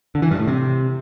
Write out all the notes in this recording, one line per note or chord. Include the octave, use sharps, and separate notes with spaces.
D3
E3
G2
A2
C3